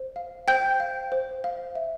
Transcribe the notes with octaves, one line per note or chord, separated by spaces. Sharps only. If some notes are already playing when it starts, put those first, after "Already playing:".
Already playing: C5
F5
C5 G5 G6
F5
C5
F5
E5